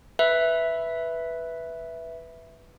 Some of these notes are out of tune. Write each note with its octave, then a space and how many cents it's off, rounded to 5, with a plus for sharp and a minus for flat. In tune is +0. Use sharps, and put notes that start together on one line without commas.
B4 +0 E5 +0